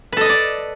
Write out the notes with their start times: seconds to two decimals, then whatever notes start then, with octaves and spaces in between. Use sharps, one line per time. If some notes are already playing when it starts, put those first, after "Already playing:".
0.13 B4
0.17 A4
0.21 D#5
0.25 A5
0.29 D5